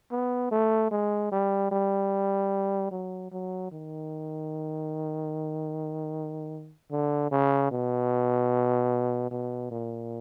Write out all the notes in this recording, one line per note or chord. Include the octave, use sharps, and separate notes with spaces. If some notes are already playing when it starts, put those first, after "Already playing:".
B3
A3
G#3
G3
G3
F#3
F#3
D#3
D3
C#3
B2
B2
A#2